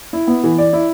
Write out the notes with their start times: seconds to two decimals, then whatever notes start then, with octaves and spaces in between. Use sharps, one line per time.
0.13 E4
0.27 B3
0.44 E3
0.58 D5
0.73 E4